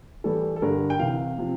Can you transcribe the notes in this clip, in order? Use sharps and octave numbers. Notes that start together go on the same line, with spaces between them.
A2 E3 G3 A4
A4
G2 D3 G3 A#4
G5
C2 C3 E3 F5
C3 F3